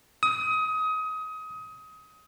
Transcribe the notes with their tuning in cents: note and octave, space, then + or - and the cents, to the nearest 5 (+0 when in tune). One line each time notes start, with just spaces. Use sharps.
D#6 +25